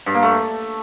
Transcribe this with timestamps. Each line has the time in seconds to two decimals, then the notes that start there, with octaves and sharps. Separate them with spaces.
0.06 G2
0.14 A#3
0.23 A3